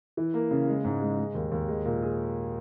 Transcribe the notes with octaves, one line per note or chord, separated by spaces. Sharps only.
E3
A#3
C#3
G#3
G#2
G#3
G#3
D#2
D#2
G#3
A#2
G#4